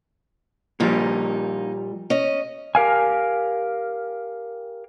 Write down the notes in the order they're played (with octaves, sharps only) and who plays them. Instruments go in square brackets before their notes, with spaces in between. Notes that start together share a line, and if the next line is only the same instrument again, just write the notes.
[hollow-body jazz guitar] A#2 F3 G3 [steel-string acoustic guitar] A#3 D#4
[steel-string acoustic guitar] C#4 D#5
[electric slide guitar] G4 A#4 F5 G#5